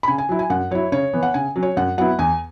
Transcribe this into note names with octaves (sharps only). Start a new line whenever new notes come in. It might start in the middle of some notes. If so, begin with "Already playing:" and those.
B5
C#3 G#5
G#5
F#3 E4
G#5
F#2 F#5
F#3 E4 C#5
C#3 C#5
E3 B3
F#5
C#3 G#5
F#3 C#4
C#5
F#2 F#5
F#3 B3 E4 F#5
E2 G#5